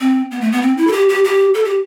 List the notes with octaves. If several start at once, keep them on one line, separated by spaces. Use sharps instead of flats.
C4
B3
A3
B3
C4
E4
A4
G4
G4
G4
A4
G4